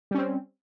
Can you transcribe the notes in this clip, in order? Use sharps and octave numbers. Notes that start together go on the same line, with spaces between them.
G3 C4 C#4